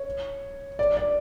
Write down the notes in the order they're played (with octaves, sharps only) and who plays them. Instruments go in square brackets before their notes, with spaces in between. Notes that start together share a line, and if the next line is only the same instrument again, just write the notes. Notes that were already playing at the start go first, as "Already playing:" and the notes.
Already playing: [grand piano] C#5
D5
D5